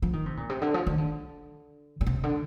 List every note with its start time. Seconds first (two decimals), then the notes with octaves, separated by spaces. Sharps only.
0.02 F3
0.13 D#3
0.26 C3
0.37 A#2
0.49 C3
0.62 D3
0.74 F3
0.87 D#3
0.98 D3
2.01 A#2
2.06 C3
2.23 D3